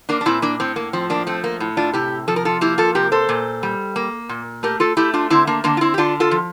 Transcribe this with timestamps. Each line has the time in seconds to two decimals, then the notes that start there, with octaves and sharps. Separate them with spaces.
0.09 A#3 D4
0.21 D4
0.26 A#2 C4 E4
0.42 A#3 D4
0.60 A2 C4
0.76 A#3
0.93 F3 C4
1.10 A#3 D4
1.27 A3 C4
1.44 A#3
1.60 A2
1.77 D4 F4
1.93 C3 E4 G4
2.28 F3 A4
2.36 A#4
2.45 F4 A4
2.61 A#3 E4 G4
2.78 F4 A4
2.95 C3 G4 A#4
3.12 A4 C5
3.29 A#2
3.63 G3
3.96 A#3
4.29 A#2
4.63 A3 G4 A#4
4.80 F4 A4
4.97 A3 E4 G4
5.14 D4 F4
5.30 D3 C4 E4
5.47 A#3 D4
5.64 D3 A#3 D4
5.77 F4
5.81 C4 E4
5.94 G4
5.98 D3 D4 F4
6.20 F4 A4
6.31 F3